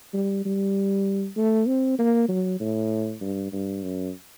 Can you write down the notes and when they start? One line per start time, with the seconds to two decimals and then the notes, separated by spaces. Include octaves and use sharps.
0.14 G3
0.45 G3
1.37 A3
1.67 C4
1.99 A#3
2.29 F#3
2.60 A2
3.21 G2
3.52 G2
3.83 F#2